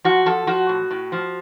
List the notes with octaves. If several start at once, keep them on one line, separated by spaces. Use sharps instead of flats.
F3 F#4
F3 A4
F3 F#4
A2
A2
F3